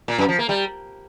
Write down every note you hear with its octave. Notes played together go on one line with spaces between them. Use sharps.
A#2
F#2
F3
A#3
G3